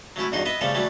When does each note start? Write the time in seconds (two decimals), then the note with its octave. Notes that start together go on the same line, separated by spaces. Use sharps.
0.16 F#3 A3 C#4 E4
0.32 E2 G2 D#4 F#4 C6
0.46 B3 D#5 E5
0.61 C#3 F3 G3 A3 A4
0.75 E3 F#3 G3 A3